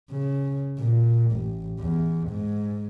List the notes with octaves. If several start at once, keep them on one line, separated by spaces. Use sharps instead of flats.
C#3
A#2
A1
E2
G#2